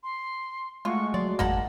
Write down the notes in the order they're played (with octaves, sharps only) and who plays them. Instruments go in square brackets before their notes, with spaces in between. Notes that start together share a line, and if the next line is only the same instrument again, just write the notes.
[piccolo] C6
[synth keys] G#3 A3 F#4 [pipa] F4 [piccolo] C#6
[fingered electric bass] F#3 [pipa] D5 [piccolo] C6
[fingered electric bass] G#1 F2 G#2 [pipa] A#3 D#4 F#5 [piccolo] A5